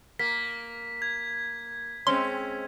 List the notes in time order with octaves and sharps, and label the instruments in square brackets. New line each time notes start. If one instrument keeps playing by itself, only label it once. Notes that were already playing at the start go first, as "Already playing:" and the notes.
[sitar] A#3 [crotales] B6
[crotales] G#6
[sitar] G#3 C4 C#4 [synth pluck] C6